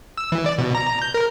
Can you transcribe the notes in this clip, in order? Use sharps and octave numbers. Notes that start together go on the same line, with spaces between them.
E6
E3
D5
B2
A#5
G6
A#4